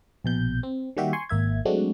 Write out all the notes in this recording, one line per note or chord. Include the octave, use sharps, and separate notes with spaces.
A#1 B2 G6
C4
D#3 G3 A#3 F#4 G4 E5
G#5 C6 C#6
G#1 A#3 E5 G#6
F#3 G#3 A3 C4 D4 F#4